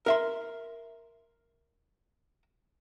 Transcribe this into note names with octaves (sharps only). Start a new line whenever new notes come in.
A#4 E5 C6